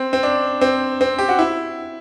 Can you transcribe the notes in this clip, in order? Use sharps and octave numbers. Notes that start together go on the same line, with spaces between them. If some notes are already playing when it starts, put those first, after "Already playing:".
Already playing: C4
C4
D4
C4
C4
G4
F#4
E4